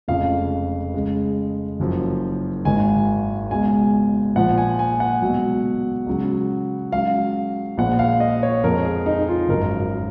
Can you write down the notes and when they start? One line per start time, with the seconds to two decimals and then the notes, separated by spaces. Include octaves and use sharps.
0.08 F1 F2 C#3 G#3 F5
0.94 C#2 C#3 G#3
1.80 F#1 F#2 F3
2.65 G#1 G#2 D#3 G#5
3.51 C#2 B2 G#3 G#5
4.36 A#1 A#2 F3 F#5
4.58 G#5
4.79 G#5
5.00 F#5
5.22 C#2 B2 F#3
6.06 C#2 C#3 F#3
6.92 C#2 C#3 F#3 F5
7.78 A#1 A#2 F3 G#3 F#5
7.99 F5
8.20 D#5
8.43 C#5
8.63 F2 F3 G#3 A#4
8.85 G#4
9.06 D#4
9.28 F4
9.49 G#1 F#2 F3 A#4